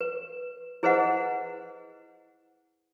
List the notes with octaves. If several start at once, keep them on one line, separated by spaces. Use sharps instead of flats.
B4
E4 G#4 B4 C5 D#5 F#5